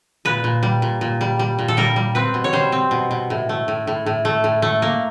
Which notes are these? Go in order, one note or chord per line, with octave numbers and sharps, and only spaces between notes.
A#2 B4
A#2
G3
A#2
A#2
G3
G3
A#2
A4
G3 A#4
G3
C4 B4
B2
C#5
G3 C5
C4
B2
B2
A2
A3
A2
A2
A2
A3
A2
A3
A#3